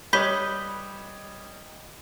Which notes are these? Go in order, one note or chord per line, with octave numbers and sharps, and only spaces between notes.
G3 B4 C#5 D#5 B5 G6 B6 G7